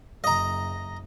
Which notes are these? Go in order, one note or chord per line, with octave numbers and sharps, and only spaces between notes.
F#1 D#5 A#5